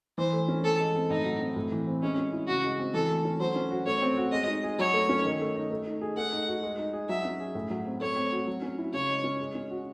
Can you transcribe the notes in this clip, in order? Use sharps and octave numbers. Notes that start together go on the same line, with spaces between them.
E3 C5
A3
C#4
E3 A4
G#3
C4
A2 D#4
F#3
C4
A2
E3
C4
G#3 C#4
C#4
E4
C#3 F#4
G#3
C4
E3 A4
A3
C#4
F#3 C5
C#4
F#4
A3 C#5
C4
F#4
G#3 D#5
D#4
G#4
F#3 C#5
A3
C#4
D#3
A3
D#4
A3
D#4
G#4
A3 F#5
D#4
F#4
G#3
D#4
G#4
F#3 E5
C#4
G#4
A2
F#3
C4
A3 C#5
C4
F#4
F#3
C#4
E4
C#3 C#5
G#3
C#4
G#3
C#4
F#4